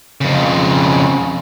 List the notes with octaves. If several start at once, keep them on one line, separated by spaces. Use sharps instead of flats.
F2 C#3